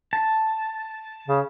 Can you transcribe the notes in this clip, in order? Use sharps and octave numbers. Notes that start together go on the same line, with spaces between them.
A5
C#3